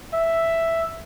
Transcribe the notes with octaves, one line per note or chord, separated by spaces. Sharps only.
E5